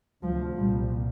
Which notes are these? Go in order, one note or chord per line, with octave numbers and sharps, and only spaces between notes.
D2 C3 F3
C2 A#2 G3